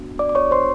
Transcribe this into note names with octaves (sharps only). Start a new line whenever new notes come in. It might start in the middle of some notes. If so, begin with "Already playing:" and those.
Already playing: B3 D4 F#4
D5 D6
D6
C#5 C#6
C5 C6